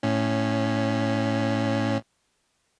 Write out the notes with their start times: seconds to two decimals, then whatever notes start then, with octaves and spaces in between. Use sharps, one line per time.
0.03 A2 C#4